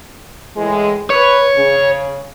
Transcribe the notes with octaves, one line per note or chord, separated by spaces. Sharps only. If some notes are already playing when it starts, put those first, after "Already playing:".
A2 E3 G#3
B4 C#5
C#3